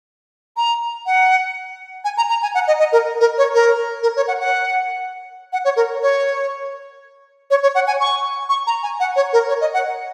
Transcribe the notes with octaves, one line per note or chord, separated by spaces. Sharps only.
A#5
F#5
G#5
A#5
A#5
G#5
F#5
D#5
D#5
A#4
A#4
C#5
A#4
A#4
C#5
F#5
F#5
F#5
C#5
A#4
C#5
C#5
C#5
F#5
G#5
C#6
C#6
A#5
G#5
F#5
C#5
A#4
C#5
D#5
F#5